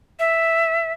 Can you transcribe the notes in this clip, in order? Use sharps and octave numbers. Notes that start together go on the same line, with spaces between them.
E5